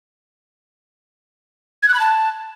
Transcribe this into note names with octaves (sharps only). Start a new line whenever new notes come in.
G#6
F#6
B5
A5